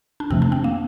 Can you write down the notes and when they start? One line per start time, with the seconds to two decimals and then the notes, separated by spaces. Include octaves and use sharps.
0.20 D4
0.30 F2 C3 F3 A3 C4
0.42 D4
0.52 C4
0.64 A#3